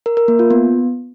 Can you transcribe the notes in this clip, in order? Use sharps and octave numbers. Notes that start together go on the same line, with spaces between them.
A#4
A#4
A#3
F4
B3